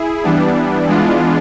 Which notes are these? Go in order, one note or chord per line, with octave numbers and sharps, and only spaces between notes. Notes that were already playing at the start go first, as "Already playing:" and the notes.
Already playing: E4 G#4
E3 G3 B3 D4
E3 G#3 B3 D4 F4